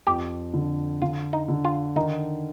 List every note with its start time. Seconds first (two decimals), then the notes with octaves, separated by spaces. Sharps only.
0.07 F2 G4
0.54 D3
1.02 D3 F4
1.33 D#4
1.49 D3
1.65 F4
1.96 D#3 D#4